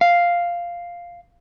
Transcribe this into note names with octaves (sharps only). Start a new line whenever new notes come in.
F5